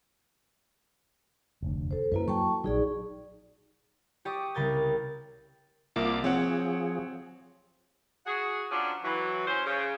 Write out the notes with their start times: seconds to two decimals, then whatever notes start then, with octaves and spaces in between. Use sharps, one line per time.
1.62 F1 D2
1.91 A4 C5
2.12 F#2 F#3 A#3 E4 B4
2.28 F#3 G5 A5 C#6
2.64 A#1 F#3 D#4 G#4 D5
4.25 G4 D5 C#6 D#6
4.54 C2 C#3 A#4 G6 A6
5.96 C2 A#3 F4 E5 D6 A6
6.24 F3 C4 G#4 C#5 F#5
8.26 F#4 G#4
8.72 F3 F#3 C#4 D4 G4 D5
9.04 E3 F#3
9.47 C#4 C5
9.66 C#3